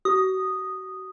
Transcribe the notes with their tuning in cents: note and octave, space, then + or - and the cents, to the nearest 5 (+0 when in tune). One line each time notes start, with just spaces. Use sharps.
F#4 +35 D#6 -5